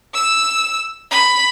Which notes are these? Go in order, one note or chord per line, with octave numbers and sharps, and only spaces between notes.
E6
B5